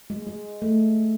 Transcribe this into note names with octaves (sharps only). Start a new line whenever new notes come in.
G#3
G#3
A3